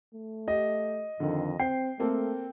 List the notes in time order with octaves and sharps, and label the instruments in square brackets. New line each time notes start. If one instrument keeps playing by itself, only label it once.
[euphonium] A3
[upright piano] G4 [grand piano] D#5
[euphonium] F2 [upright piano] D3 D#3
[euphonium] C4 [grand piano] G5 [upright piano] C7
[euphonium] A3 [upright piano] A#3 C4 A4